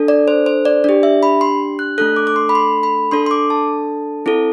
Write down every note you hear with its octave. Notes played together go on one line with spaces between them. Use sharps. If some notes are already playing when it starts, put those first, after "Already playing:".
Already playing: D4 A4
D5
C5
C5
D5
D4 G4 D5
E5
B5
C6
F#6
A3 D4 A4 F#6
D6
D6
C6
B5
C6
B5
D4 A4 C6
C6
D6
A5
C4 E4 A4